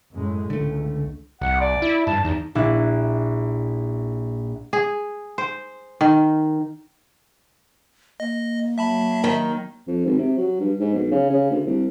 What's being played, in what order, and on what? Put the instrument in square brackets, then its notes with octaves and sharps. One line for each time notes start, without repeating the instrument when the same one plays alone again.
[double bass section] F#2 A2 G#3
[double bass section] C#2 [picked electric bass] D3 A3
[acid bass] C2 [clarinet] F#5
[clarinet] D5
[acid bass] E4
[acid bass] G2 [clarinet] A5
[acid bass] E2 [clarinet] D#4
[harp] A#1 E4 F#6
[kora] G#4
C5
D#3
[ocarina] A#3 [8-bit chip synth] D#5
[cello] F#3 [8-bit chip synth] E5 A5 B5
[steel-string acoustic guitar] D#3
[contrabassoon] F2
G#1
C3
F#3
G2
G#2
B1
C#3
C#3
D2
C2